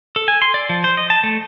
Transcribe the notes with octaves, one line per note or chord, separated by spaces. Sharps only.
A4
G#5
C6
D5
F3
C5
D#5
A5
A3